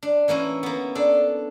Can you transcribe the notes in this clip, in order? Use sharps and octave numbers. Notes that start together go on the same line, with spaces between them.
D4
E3 A#3 C#4 E4
A#3 B3
D4 A4